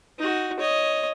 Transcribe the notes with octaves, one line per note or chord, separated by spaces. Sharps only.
D#4 F#4
C#5 D#5